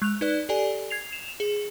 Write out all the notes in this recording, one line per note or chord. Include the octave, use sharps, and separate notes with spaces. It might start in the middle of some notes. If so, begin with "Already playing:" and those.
G#3 F#6 F7
D#4 B4 D5 F#6
G4 A4 D5 G#5
G#6 C7 F7
E7 F7
G#4